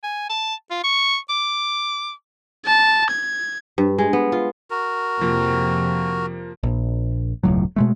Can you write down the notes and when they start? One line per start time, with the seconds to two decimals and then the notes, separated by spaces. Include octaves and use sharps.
0.04 G#5
0.30 A5
0.71 F4
0.84 C#6
1.30 D6
2.66 A5
3.10 G#6
3.78 G2
3.98 G#3
4.13 B3
4.32 F4
4.70 F#4 A#4
5.21 F2 C3 F3 A#3
6.63 A#1
7.43 E1 C#2 A2 F#3
7.76 B2 G#3 A3